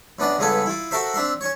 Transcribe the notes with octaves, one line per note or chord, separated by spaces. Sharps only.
F#2 B3 D4 D5 D#5
C#2 G2 B3 G#4 A4 B4
E4 F4
F#4 A4 A#4 C5 E5
C4 D4 E5 C6
C#4 C#5